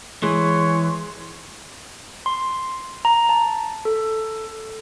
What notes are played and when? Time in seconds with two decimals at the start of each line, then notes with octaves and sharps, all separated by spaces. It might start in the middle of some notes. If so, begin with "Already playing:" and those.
0.23 E3 G#3 C#5 C6
2.26 C6
3.05 A#5
3.29 A5
3.85 A4